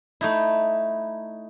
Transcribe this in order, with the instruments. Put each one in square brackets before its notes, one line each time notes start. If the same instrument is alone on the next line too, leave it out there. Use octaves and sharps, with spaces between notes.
[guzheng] A3 D#4 E4